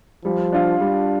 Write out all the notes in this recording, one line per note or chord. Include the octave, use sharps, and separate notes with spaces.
F3 G3
D4 F4
G3 D4